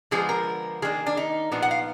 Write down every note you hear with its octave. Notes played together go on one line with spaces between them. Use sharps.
D3 F3 G#3 B3 G#4
A#4
D#3 A#3 D4 G#4
D4
D#4
A#2 F3 B3 D4
F#5
F5